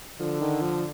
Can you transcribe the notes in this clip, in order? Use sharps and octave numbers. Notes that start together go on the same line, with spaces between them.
D3 F3
D#3
F3